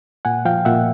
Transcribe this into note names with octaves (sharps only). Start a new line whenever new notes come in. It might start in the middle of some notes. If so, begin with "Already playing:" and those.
A#2 F#5 G#5
F3 F5 G5
A#2 E5 F#5